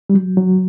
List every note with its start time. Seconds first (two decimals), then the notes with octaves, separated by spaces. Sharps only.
0.10 G3
0.14 F#3
0.37 F#3